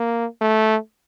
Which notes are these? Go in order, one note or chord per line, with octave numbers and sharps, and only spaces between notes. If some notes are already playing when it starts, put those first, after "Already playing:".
Already playing: A#3
A3